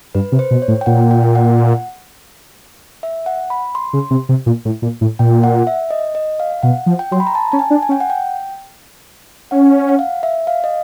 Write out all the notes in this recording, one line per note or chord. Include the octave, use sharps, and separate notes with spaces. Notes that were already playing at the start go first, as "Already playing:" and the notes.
G2 B4
C3
C5
B2
C#5
A2
G5
A#2 F#5
G5
F#5
E5
F#5
B5
C6
C#3
C3
C3
A#2
A2
A#2
A2
A#2 G5
F#5
E5
D#5
D#5
F5
B2 F#5
F3
G5
F#3 C6
B5
A#5
A5
C#4 A5
G#5
D4
G#5
C#4
G5
F#5
G5
C#4 F#5
F#5
F5
E5
F5
D#5